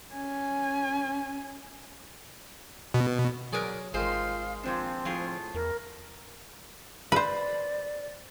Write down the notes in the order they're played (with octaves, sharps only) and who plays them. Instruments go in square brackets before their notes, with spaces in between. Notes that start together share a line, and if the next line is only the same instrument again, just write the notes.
[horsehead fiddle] C#4 G#5
[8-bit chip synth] B2
[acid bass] F#3 [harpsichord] F#4 G#4 [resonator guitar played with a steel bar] A#4 B4 D5
[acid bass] G#1 [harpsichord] D#3 G#3 [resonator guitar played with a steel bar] F4 C5 [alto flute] F5
[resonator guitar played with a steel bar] A#2 F3 D4 [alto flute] C4
[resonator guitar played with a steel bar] A2 F4 G#4 [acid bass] F3
[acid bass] E2 [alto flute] A#4
[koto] B4 C5 [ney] D5